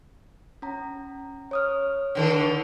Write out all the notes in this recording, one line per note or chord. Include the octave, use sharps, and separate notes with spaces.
C#4 A#5
C#5 D#6 F6
D3 D#3 A4